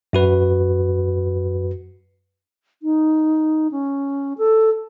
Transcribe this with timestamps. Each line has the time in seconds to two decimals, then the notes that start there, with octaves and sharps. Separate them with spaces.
0.13 F#2 F#4 B4
2.82 D#4
3.71 C#4
4.38 A4